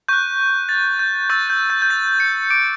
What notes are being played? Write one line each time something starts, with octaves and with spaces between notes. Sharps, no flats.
C#6 F#6 G6
A6
G6
C#6 E6 G6 A6
G6
G6
G6
A6
C#7
D6 G6 D7